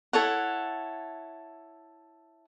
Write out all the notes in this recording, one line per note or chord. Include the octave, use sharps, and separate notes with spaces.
E4 A4 C#5 F#5